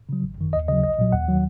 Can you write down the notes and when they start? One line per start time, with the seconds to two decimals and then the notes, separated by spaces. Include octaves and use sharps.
0.09 C#3 F#3
0.23 G#1
0.38 F#2 D#3
0.53 D#2 D#5
0.68 C#3 D#5
0.72 F#3
0.83 A#1 D#5
0.99 A#2 F#3
1.12 D#2 F#5
1.28 D#3 F#3